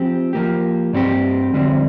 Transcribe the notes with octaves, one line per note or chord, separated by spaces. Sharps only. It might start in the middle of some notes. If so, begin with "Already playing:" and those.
Already playing: F3 C4 G4
F3 A#3 G4
G2 G3 C4 G4
F2 D3 G3 C4